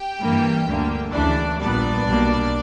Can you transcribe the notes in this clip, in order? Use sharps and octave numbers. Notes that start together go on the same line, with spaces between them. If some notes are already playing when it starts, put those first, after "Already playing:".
Already playing: G4 G5
G2 E3 G3 A#3
D2 D3 A#3
D2 C#3 E3 D4 D5
A#1 A#2 G3 B3 D4 D5
B1 B2 G3 A#3